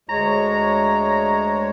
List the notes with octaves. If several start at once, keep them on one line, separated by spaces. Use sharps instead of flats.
D2 G#3 C#5 A#5